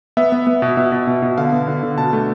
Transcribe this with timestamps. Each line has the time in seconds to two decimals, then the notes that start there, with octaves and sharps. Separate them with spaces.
0.17 B3 E5
0.32 B3
0.47 B3
0.62 B2
0.77 B2 E5
0.92 B2
1.07 B2
1.22 B2
1.38 D3 F5
1.52 B3
1.68 D3
1.83 D3
1.98 B2 A5
2.13 A3